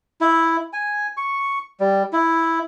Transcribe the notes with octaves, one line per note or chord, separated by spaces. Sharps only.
E4
G#5
C#6
G3
E4